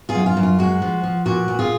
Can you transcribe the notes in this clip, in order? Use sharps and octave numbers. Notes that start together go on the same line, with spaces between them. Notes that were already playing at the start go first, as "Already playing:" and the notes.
F4 G#4
F#2
F4
F#2
F4
G#3 F#4
F3
F3
A#2 F#4
A#2
F4 G#4